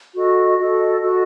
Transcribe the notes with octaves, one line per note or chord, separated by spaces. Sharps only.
F#4 A4 D#5
F#4 A4 D#5
F#4 A4 D#5